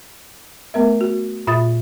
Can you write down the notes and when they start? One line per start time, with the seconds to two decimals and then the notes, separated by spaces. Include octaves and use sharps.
0.74 A3 B3 A#4 E5
1.01 F#4
1.47 A#2 F4 E5 B5 D#6 A6